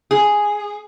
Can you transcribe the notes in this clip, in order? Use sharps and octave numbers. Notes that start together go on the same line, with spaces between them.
G#4